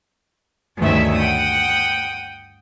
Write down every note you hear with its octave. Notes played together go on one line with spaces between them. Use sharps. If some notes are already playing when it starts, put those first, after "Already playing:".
D2 G2 D#3 A3 C#4 E5
F#5 G5 D#6